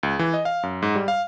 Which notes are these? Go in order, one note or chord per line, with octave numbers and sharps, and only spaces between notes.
C#2
E3
D#5
F5
F#2
G#2
G3
F5